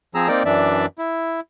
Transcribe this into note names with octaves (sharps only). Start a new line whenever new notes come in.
F3 C4 G#4 A#5 E6
A#3 C4 D#4 A#4 D5 G5
F#2 E3 D4 D5 E5
E4